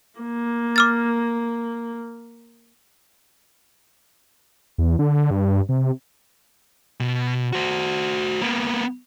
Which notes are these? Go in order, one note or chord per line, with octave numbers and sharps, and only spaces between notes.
A#3
D6 F6 A6
E2
D3
G2
C3
B2
F#4 C5
A#3 B3